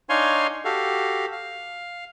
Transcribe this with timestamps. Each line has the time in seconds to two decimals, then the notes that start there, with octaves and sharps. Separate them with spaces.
0.09 D4 D#4 C#5 F5 G#5 C6
0.65 F#4 G4 A4 F5
1.32 F5